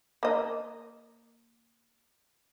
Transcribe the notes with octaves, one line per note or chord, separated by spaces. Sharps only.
A#3 D#5